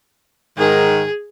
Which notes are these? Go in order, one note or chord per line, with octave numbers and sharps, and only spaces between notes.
G#2 D#3 G#4